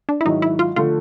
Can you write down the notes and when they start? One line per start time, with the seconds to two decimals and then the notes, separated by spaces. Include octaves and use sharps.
0.09 D4
0.21 E4
0.26 G#2 D#3 F#3 D#4
0.42 E4
0.59 F4
0.76 D3 F3 A3 F4